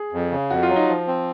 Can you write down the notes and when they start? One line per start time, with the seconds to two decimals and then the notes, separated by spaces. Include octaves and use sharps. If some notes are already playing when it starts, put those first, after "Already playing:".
Already playing: G#4
0.13 F2
0.31 C#3
0.50 F2 F#4
0.63 F4
0.69 F#3
0.76 D#4
0.88 F3
1.07 C4